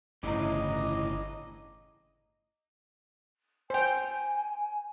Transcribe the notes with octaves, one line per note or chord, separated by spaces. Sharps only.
G1 A2 C#3 E3 D#5 A#5 D6
C5 G5 G#5